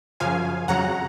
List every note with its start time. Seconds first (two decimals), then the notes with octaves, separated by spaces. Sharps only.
0.20 F#2 C#3 F3 F5 G#5
0.68 F2 C#3 F#3 F#5 A#5